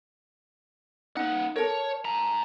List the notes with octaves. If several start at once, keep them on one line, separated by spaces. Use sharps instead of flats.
A#3 D#4 F#5
A4 A#4 C#5
G#5 A#5